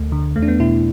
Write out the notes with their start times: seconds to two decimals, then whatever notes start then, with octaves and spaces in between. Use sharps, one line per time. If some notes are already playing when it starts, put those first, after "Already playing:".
Already playing: D2 A3
0.12 D3
0.36 E2 A3
0.42 D4
0.48 B3
0.60 B2 E4